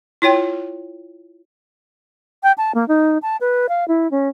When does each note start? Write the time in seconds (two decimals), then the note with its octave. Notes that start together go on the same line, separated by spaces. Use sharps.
0.22 E4 F4 C#5 G5
2.43 G5
2.58 A5
2.75 A#3
2.88 D#4
3.22 A5
3.41 B4
3.69 F5
3.88 E4
4.11 C#4